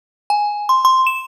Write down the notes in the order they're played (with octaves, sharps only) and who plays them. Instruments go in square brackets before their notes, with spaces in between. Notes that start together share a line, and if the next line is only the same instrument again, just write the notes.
[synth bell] G#5
C6
C6
E7